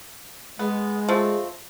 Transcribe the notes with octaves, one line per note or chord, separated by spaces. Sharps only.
G#3 B3
F3 A3 C4